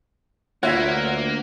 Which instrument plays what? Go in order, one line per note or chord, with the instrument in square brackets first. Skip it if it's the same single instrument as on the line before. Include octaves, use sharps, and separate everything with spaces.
[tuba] D2 [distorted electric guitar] A#3 [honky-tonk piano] F4 F#5 G#6 [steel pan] C#5 E5